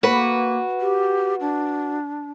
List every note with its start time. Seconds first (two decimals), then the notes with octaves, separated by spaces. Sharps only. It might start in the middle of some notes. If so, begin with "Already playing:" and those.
0.03 A#3 F#4 B4
0.80 G4
1.41 D4